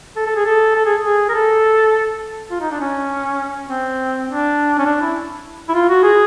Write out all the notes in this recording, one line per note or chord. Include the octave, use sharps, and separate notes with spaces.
A4
A4
G#4
A4
A4
G#4
G#4
A#4
A4
F4
D#4
D4
C#4
C4
D4
C#4
D4
E4
E4
F4
F#4
G#4